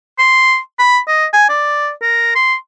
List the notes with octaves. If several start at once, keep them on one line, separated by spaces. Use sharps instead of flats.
C6
B5
D#5
G#5
D5
A#4
C6